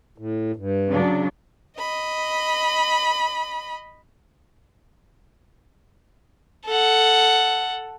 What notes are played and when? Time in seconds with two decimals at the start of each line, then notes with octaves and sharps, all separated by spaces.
0.18 A2
0.56 G2
0.90 C#3 F#3 D4
1.78 D#5 B5
6.66 A4 F#5